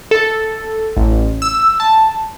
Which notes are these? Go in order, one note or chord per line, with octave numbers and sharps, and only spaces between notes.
A4
A1
E6
A5